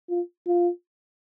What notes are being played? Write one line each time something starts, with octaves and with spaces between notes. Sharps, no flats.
F4
F4